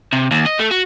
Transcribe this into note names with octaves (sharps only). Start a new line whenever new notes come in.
C3
D#2
D#5
A3
F#4